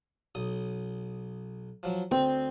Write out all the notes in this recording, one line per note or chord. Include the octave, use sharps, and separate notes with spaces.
B1 D#6
F3 F#3
D2 C4